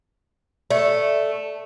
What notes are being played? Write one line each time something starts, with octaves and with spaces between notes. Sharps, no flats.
A3 D5